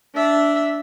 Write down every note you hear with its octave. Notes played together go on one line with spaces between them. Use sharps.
D4 E5